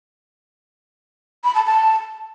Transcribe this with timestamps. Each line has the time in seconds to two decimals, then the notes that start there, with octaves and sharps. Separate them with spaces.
1.44 B5
1.55 A5
1.66 A5